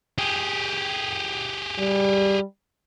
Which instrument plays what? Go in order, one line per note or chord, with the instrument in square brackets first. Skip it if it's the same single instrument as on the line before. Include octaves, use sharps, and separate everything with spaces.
[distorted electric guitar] G4 G#4
[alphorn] G3